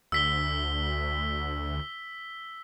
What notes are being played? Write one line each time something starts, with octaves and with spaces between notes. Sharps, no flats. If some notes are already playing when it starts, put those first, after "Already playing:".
D2 E6 B6 G7